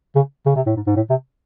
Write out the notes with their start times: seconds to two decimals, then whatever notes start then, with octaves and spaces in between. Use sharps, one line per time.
0.16 C#3
0.46 C#3
0.56 C3
0.66 A2
0.76 G#2
0.87 G#2
0.96 A2
1.10 C3